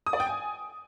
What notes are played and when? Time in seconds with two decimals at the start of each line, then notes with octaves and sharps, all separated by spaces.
0.06 D#6
0.13 D5
0.20 G5
0.27 G#5